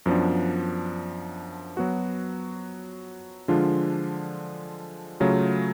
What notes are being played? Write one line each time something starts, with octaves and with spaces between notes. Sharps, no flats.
F#2 F3 B3 D4
F#3 B3 F#4
D3 F3 G#3 D4 F4
C#3 F#3 A3 F4